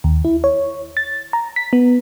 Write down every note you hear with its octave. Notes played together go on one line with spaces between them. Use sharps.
D#2
E4
C#5
A6
A#5
B6
B3